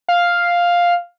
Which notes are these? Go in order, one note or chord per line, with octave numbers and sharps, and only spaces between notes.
F5